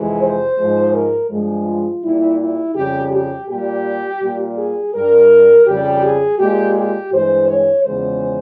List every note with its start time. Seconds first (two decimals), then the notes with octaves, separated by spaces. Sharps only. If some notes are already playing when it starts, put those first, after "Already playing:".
Already playing: F2 C3 E3 G#3
0.20 C5
0.57 G#2 F3 G#3
0.93 A#4
1.29 G2 F3 G#3
1.66 F4
2.02 A#2 G3 E4
2.39 E4
2.75 F2 C#3 G3 G4
3.12 G4
3.48 A#2 G3 G4
4.21 A#2 G3
4.56 G#4
4.94 G2 G3 A#4
5.66 F2 C#3 G3 G4
6.03 G#4
6.38 A#2 G#3 G4
6.75 G4
7.12 G2 E3 G#3 C5
7.48 C#5
7.85 E2 C#3 F3 G#3 C5